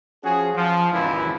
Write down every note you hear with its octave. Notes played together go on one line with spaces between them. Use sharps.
F3 C#4 F#4 G#4
F3
G#1 C#2 F#2 A#2 E3 E4